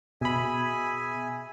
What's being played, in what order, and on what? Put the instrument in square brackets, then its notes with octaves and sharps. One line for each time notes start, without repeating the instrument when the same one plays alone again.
[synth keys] B2 B5 [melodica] G#4 E5 G#5